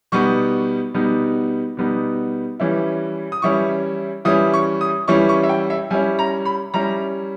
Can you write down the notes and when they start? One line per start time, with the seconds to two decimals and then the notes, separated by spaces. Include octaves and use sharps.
0.12 B2 G3 B3 D#4 C#6
0.94 B2 G3 B3 D#4
1.77 B2 G3 B3 D#4
2.60 E3 G3 C#4 E4
3.32 D#6
3.42 E3 G3 C#4 E4 C#6
4.25 E3 G3 C#4 E4 D#6
4.54 C#6
4.81 D#6
5.08 E3 G3 C#4 E4 C#6
5.29 C#6
5.43 E5
5.49 G5
5.70 E5
5.90 G3 C#4 E4 G#5
6.19 A#5
6.45 B5
6.74 G3 C#4 E4 A#5